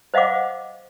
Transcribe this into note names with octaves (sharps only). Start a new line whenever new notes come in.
C5 D#5 F5 F#5 D6